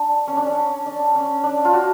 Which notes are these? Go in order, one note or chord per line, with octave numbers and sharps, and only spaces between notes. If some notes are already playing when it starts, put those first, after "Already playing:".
Already playing: D4
C#4
D4
C#4
D4
C#4
D4
F4
F#4